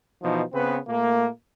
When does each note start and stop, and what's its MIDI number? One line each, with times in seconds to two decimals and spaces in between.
0.23 0.42 47
0.23 0.42 52
0.23 0.42 53
0.23 0.42 63
0.53 0.78 49
0.53 0.78 59
0.53 0.78 60
0.53 0.78 71
0.87 1.28 46
0.87 1.28 57
0.87 1.28 58